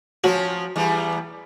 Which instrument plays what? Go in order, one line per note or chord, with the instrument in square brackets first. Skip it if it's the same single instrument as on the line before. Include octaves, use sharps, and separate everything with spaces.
[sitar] F3 F#3 C#4 [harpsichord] F#4
[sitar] E2 G3 B3